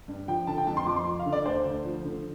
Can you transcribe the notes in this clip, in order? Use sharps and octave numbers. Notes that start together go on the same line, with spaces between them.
G2
F3 G5
D3 A5
G5
F2 A5
C6
F2 D6
C6
F3
F5
D3
D5
D2 C5
D2
F3
D3